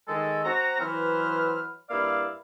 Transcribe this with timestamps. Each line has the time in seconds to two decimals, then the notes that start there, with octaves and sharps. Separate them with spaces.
0.08 D#3 G#3 A4
0.45 C4 F#4 A#5
0.79 E3 F#3 B4 C5 E5 F6
1.90 G2 A#3 E4 D5 F5